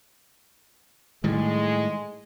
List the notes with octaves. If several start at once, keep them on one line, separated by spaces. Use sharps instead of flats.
A2 D#3 G3 G#3